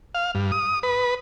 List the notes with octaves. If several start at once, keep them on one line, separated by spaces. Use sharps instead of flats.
F5
G2
D#6
B4